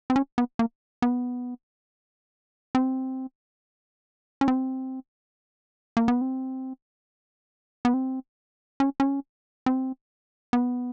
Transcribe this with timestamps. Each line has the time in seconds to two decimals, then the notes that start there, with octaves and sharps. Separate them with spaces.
0.10 C4
0.16 C#4
0.38 B3
0.59 A#3
1.02 B3
2.75 C4
4.41 C#4
4.48 C4
5.97 A#3
6.08 B3
6.21 C4
7.85 B3
7.94 C4
8.80 C#4
9.00 C#4
9.66 C4
10.53 B3